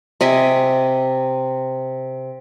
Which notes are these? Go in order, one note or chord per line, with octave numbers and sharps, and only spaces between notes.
C3 D#5 E5 G#5